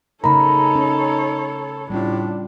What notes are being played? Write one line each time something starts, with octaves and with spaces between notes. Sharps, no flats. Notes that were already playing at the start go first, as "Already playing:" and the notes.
C#3 A3 D#4 A4 A#4 C#5 A#5 B5
C#4
A2 G3 C#4 D4 F4